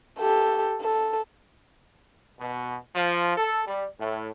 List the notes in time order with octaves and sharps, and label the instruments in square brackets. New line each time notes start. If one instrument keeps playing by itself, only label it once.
[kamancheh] G4 A4
A4
[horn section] B2
F3
A4
G3
A2